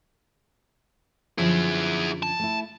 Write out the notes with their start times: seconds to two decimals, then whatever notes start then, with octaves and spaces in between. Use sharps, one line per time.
1.38 F#2 D3 F3 E4 G#4
2.23 A5
2.39 A3 E4